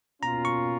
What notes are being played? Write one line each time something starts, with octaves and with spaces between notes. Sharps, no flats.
B2 A#3 C#4 F4 A#5
C#6